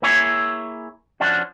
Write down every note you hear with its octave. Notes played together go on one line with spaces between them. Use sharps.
A#3 E4 G#4 C#5
F3 C#4 D4 F#4